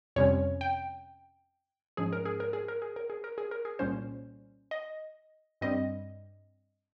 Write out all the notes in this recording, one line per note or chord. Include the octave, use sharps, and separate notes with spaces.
F2 C3 G3 C#4 C#5
G5
G#2 F3 G#3 C#4 G#4
A#4
G#4
A#4
G#4
A#4
G#4
A#4
G#4
A#4
G#4
A#4
G#4
C2 A#2 G3 A#3 C#4 C5
D#5
G2 G3 C4 D#5